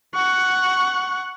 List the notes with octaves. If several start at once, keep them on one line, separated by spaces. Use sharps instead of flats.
F#5 C#6